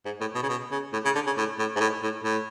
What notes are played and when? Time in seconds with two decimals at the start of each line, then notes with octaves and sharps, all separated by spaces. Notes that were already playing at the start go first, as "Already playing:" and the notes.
0.06 G#2
0.21 A2
0.35 B2
0.43 C#3
0.49 B2
0.71 C#3
0.93 A2
1.05 C#3
1.15 D3
1.26 C#3
1.37 A2
1.59 A2
1.76 G#2
1.81 A2
2.03 A2
2.24 A2